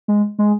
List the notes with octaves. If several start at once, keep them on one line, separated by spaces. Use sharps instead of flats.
G#3
G#3